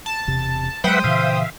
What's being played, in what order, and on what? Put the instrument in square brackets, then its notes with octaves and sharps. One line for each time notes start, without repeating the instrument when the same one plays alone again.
[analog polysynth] A5
[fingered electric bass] E1 C3
[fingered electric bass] F#3 G#3 [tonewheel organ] B4 E5 F#5 [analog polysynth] C5 G5 D#6
[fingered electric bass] A#2 C#3 E3 [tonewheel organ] E5 F5